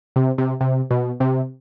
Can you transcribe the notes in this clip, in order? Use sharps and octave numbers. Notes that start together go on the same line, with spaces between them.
C3
C3
C3
B2
C3